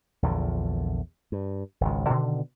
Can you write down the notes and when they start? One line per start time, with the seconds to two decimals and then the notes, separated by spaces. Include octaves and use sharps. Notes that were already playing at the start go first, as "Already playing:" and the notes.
0.22 A#1 E2 D3
1.32 G2
1.81 G#1 C#2
2.09 B2 D3 D#3